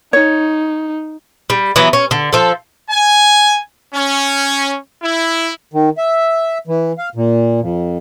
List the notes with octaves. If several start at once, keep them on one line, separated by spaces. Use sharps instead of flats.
D#4 C#5
G3
E3 F#3 B3
C#4
D3
F3 A4
G#5
C#4
E4
D#3
E5
E3
F5
A#2
F2